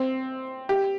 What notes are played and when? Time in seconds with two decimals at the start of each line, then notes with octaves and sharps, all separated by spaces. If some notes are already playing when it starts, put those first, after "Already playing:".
Already playing: C4
0.69 G4